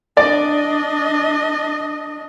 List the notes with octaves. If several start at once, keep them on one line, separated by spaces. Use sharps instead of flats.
D4 D5 D#5